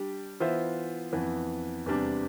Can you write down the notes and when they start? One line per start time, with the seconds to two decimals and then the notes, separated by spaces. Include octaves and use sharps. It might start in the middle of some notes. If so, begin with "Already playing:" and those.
Already playing: G3 D4 G4
0.40 E3 B3 F4 C5 E5
1.13 F2 E3 B3
1.86 E2 C3 G3 D4